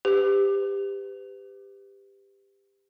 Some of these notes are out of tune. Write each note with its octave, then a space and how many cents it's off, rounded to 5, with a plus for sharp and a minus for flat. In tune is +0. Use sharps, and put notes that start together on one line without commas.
G4 +15 B4 +35